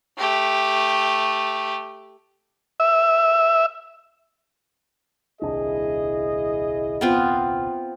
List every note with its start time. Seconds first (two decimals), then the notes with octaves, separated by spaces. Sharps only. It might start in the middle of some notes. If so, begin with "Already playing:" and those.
0.18 A3 G4
2.80 E5
5.42 D#1 C2 D4 E4 G#4 D#5
7.01 B3 C4 F4